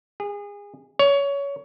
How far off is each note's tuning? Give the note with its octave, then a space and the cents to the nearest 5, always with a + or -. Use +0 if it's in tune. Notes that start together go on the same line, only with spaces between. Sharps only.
G#4 -30
C#5 +20